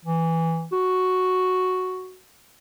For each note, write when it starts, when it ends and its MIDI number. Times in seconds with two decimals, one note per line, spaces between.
0.05 0.66 52
0.72 2.20 66